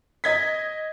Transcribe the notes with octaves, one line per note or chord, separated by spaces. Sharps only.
D#5 G#6 B6